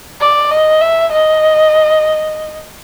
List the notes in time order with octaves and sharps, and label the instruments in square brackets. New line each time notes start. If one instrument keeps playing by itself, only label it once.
[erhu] D5
D#5
E5
D#5